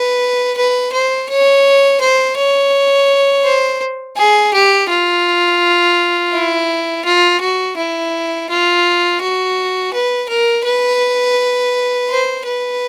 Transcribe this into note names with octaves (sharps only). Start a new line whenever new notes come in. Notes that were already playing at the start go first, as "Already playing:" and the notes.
Already playing: B4
B4
C5
C#5
C5
C#5
C5
G#4
G4
F4
E4
F4
F#4
E4
F4
F#4
B4
A#4
B4
C5
B4